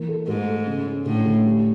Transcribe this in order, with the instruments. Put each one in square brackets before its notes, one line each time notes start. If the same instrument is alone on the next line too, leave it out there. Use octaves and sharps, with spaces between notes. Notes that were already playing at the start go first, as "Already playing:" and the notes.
Already playing: [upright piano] E3 A#3
A4
[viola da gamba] G#2 [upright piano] A3
[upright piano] A4
C#3
C#4
[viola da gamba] A2 [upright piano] D3
[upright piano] D3
G3